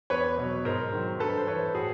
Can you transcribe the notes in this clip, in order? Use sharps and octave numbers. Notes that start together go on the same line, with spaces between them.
E2 B4 C#5
B2 F#3
G#2 A#4 C5
D#3 F#3
G2 A4 B4
C5
E3 B4 C#5
A2 F#4 G#4